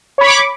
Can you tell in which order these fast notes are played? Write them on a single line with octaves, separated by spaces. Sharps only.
C#5 B5 C#6 D6